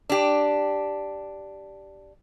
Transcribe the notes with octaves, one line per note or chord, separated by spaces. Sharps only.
D4 G4